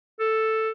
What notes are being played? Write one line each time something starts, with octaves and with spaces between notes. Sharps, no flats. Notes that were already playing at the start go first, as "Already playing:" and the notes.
A4